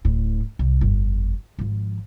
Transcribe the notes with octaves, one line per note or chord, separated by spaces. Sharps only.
D1 A2
C2
G1 F2
G#1 F3